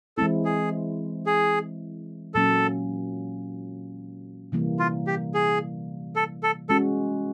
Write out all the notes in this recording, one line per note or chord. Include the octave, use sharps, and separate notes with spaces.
E3 G#3 C4 E4 A4
G#4
G#4
A#2 F#3 A#3 C#4 A4
C3 E3 G3 A#3
F4
G4
G#4
A4
A4
G#3 C#4 F#4 A4